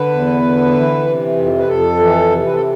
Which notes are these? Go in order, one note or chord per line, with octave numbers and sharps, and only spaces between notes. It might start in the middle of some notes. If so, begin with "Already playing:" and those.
Already playing: D3 B4
E2
D3
E3
C3
F2
B4
F2 A4
E3
C3
B4
A4